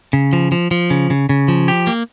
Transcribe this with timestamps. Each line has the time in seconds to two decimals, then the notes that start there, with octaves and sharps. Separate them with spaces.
0.13 C#3
0.33 F3
0.52 F3
0.71 F3
0.90 C#3
1.10 C#3
1.29 C#3
1.48 F3
1.68 G4
1.87 A#3